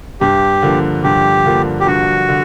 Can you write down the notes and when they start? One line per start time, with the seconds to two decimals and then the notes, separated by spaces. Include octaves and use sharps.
0.21 G2 G4
0.62 D3 F3 A#3
1.04 G2 G4
1.46 D3 F3 A#3
1.80 G4
1.87 G2 F#4
2.29 D3